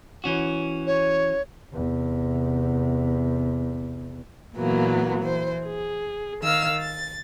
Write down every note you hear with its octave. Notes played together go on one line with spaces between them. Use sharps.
E3 C#4 F#4
C#5
E2 C3
A#2 E3 F#3 A#3 B3
E3 C5
G#4
D#3 F5 E6 F6
A6